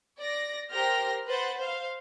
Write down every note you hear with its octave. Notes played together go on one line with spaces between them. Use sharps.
D5 A#6
G4 A#4 C5 G5 F6 A#6
B4 C5 F#5 A6
C5 F5